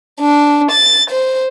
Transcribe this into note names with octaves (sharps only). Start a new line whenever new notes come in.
D4
A6
C5